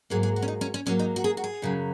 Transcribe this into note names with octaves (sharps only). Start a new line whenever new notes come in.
G#2 F#3 A#3 G#4
G#4
F#4
C#4
D#4
C#4
C#4
G#2 F#3 A#3 C#4
D#4
F#4
G#4
F#4
G#4
F#2 C#3 F#3